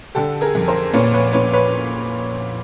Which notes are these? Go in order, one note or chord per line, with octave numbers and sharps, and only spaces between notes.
D3 G4 A4
G#4 A#4
F2
A#4 C5
A#2 B4 C#5
B4 C#5
A#2 B4 C#5
B4 C#5